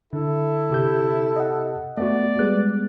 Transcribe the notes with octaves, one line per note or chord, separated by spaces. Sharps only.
D3 E4 A4
C3 G4 G6
D#5 F#5
A3 B3 F#4 D5
G3 G#3 B3 F#6